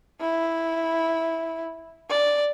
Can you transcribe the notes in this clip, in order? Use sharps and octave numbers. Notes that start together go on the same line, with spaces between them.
E4
D5